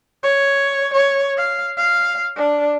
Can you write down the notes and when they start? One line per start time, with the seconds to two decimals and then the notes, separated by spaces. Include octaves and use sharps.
0.23 C#5
0.93 C#5
1.38 F5
1.77 F5
2.36 D4